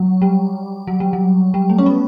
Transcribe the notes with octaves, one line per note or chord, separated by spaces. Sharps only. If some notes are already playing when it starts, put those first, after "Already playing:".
Already playing: F#3
G3
F#3
G3
F#3
G3
A3
C#4
B3